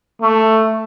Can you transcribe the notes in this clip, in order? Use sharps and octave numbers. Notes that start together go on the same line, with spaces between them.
A3